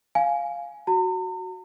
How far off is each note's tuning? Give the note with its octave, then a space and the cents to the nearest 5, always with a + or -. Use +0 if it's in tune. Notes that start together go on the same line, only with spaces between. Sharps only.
F5 +0 G#5 +10
F#4 +0 A#5 -40